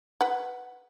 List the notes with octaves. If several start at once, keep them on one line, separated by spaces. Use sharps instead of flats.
B4 F#5